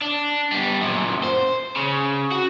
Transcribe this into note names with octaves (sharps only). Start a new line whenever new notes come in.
D4
G3 B3
F#2 A#2
C5
C#3
F#4